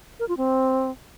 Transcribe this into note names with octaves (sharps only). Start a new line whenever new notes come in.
A#4
F4
C4